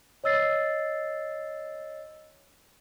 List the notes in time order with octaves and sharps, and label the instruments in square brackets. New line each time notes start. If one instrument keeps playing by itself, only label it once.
[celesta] C#5 D#5 E6 A6 C7